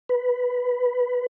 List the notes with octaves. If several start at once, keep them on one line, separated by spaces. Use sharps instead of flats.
B4